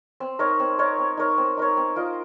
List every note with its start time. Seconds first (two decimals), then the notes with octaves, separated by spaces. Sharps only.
0.20 C4
0.39 D#4 A#4 C#5
0.60 C4
0.79 D#4 A#4 C#5
0.99 C4
1.17 D#4 A#4 C#5
1.38 C4
1.57 D#4 A#4 C#5
1.77 C4
1.96 F4 A#4 D#5